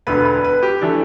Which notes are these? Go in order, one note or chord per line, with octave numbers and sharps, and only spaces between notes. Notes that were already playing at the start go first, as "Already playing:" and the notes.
E1 D2 D3 B4
B4
B4
G4
E3 A3 D4